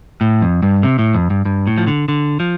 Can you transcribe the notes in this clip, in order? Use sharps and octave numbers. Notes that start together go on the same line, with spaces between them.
A2
F2
G2
C3
A2
F2
G2
G2
A2
F3
D3
D3
F3